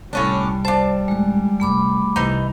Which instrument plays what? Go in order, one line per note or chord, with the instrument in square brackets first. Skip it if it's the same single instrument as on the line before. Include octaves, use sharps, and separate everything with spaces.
[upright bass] C2 [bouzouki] A2 C#4 D4 [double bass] G3
[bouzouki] D4 A5 [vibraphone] C5
[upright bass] A1 D2 [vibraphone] G#3
[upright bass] F#2 C3 [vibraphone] A3 B5 D6
[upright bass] C2 C3 [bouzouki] E3 D#4